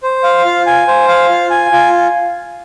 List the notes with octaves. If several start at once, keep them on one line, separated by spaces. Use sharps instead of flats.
C5
F5
F4
G#5
C5
F5
F4
G#5
F4